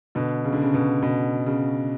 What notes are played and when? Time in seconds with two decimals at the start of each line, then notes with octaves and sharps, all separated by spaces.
0.15 B2 D3
0.44 C#3
0.53 D3
0.62 C#3
0.74 B2
1.02 B2
1.46 C#3